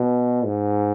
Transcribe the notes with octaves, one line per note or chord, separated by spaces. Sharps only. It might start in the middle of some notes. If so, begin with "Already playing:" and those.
Already playing: B2
G#2